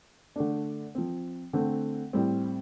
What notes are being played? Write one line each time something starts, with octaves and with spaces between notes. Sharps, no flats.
D3 A3 D4
F3 C4
D3 A3 C4
A2 G3 C4